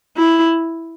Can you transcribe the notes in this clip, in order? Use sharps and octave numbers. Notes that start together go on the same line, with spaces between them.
E4